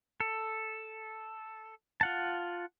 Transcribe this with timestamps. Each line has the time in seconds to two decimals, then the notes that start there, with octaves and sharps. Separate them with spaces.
0.20 A4
2.01 F4 F#5 A5